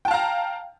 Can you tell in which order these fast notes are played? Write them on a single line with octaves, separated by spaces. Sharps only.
G5 A5 F5 A#5